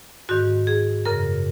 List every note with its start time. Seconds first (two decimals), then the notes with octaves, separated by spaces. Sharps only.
0.29 G#2 D#3 F#4
0.67 G#4
1.05 F#2 C#3 A#4